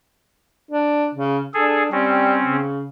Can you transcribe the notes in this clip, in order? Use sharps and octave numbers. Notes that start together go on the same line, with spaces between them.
D4
C#3
D4 G#4 A4
G3 C4 C#4
C#3